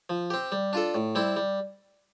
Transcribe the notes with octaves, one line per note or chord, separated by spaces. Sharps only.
F3
C4 G4
G3
D4 F4 A4
A2
G3 C4 E4
G3